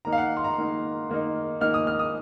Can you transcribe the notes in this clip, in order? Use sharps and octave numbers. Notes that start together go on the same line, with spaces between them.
D#3 A#3 D#4 A#5
F5
F#5
C6
A#5
D#3 A#3 D#4
D#3 A#3 D#4
D#3 A#3 D#4 F6
D#6
F6
D#6